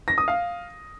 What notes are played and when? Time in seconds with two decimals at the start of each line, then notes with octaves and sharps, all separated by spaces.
0.08 A#6
0.18 D#6
0.28 F5